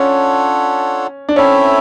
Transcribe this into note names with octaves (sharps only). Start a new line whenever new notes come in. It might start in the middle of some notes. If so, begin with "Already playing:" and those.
Already playing: C#4 D4 F4 A4 C#5 F#5
D4
C4 C#4 E4 A4 C#5 E5